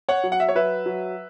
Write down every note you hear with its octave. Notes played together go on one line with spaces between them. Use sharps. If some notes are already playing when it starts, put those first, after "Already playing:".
C#5 F#5
F#3
F#5
E5
C#5
F#3 B4 E5
F#3